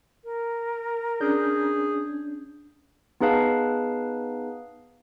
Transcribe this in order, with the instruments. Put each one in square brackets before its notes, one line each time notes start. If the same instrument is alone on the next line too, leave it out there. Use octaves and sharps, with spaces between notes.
[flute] A#4
[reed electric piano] C#4 D4 G6 [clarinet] G#4
[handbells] B3 D#4 G#4 B4 F5 A5